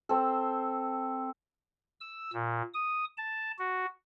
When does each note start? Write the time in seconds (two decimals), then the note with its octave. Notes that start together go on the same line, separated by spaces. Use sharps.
0.09 C4 A4
2.00 E6
2.34 A#2
2.74 D#6
3.17 A5
3.59 F#4